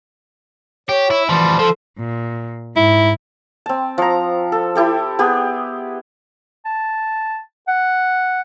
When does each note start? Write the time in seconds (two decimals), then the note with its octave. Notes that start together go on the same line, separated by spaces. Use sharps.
0.89 G4 C#5
1.10 E4
1.29 E3 F3 G3
1.59 F3 A4
1.98 A#2
2.76 G#2 E4
3.66 C4 A5
3.98 F3 A#5
4.52 A4
4.75 E4 G4 A4
5.19 B3 G4 G#4
6.66 A5
7.68 F#5